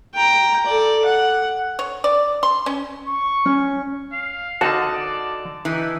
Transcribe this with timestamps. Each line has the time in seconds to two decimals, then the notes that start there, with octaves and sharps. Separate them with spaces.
0.15 G5 A#5
0.66 A4 D5
1.05 F#5
1.79 C#5
2.04 D5
2.43 C6
2.66 C#4
3.08 C#6
3.46 C#4
4.13 F5
4.61 D3 D#4 F#4 A5
4.92 D5
5.65 E3 D#4